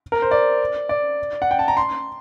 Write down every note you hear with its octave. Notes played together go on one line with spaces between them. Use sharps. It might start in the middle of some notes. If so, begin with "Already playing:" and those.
A#4
C5
D5
D5
F#5
G5
A5
A#5
C6